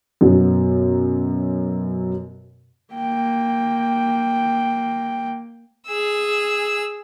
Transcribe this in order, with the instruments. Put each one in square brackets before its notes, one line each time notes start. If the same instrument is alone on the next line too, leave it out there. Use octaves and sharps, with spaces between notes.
[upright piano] F#2 B2 F#3
[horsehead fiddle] A#3 G5
[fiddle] G#4 E6